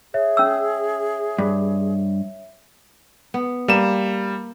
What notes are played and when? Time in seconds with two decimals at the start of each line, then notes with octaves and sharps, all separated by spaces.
0.14 G#4 C#5 E5
0.37 C#4 E6
1.38 G2
3.34 B3
3.68 G3 A#3 E7